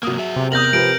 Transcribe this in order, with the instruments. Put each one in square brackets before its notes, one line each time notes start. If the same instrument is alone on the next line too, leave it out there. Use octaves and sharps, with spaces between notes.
[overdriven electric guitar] C3 A#3 [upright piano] F#3 D#6
[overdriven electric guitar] G#4 E5
[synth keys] C3
[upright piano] E2 D5 D#6 [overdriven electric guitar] A#4 [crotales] G6 A#6 F#7
[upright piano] F3 G4 B4 [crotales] D7